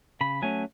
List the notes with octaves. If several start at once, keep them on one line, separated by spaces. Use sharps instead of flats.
C#3 B5
F#3 A3 C#4 G#5